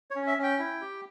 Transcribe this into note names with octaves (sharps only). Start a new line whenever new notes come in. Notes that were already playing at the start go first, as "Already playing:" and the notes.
C#5
C#4
E5
C#4 G5
E4
G4